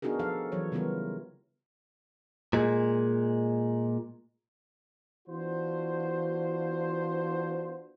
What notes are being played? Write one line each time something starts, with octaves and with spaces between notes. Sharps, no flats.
B3 D4 D#4 F#4 G#4 A#4
F3 A4 F5
E3 F#3 C#5
C#3 E3 G3 B3 F4 A#4
A#2 G#3
E3 B3 D4 F4 F#4 C5